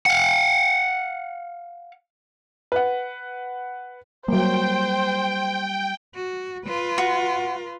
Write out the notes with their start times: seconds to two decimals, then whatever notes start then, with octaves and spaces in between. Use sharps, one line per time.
0.06 F5 F#5
2.72 B4 F#5
4.28 F#3 G3 A#3 C5 G5
6.15 F#4
6.65 F4 B4
6.98 F#4